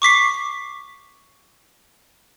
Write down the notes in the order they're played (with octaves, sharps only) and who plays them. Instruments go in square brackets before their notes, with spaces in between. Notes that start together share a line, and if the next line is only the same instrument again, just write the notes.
[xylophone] C#6 D6 B6 C7